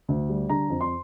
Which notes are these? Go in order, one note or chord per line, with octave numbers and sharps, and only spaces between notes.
D2
G3
D3 A#5
F2
C6